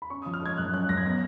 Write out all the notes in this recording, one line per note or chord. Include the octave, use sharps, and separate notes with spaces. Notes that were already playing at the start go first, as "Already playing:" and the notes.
B5
C#4 C#6
F3 D#6
F6
G#3 G#6
F#2 F#6
C#4 F#6
F#2 A#6
G#6
B3 A#6